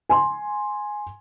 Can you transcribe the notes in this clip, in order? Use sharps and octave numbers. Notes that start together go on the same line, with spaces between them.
G#5 C6